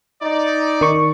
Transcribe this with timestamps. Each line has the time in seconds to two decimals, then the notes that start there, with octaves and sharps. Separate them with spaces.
0.22 D#4 D5
0.81 D#3 C#6